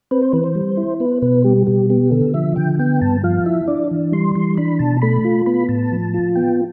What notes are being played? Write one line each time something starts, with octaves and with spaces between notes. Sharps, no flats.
C4 B4
C5
E3 B4
C5
G3
E4
B3 B4
B2 B4
G3 G4
B2 G4
B3 G4
D3 A4
F3 E5
D3 G5
B3 G5
G2 A5
F3 F5
E4 E5
D4 D5
E3
G3 C6
E3 C6
D4 B5
B2 A5
A3 B5
F4
B3 B5
A2 A5
F3
F4
B3 G5